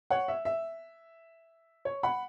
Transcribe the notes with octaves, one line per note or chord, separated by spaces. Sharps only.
C#5 F#5
E5
E5
C#5
F#5 B5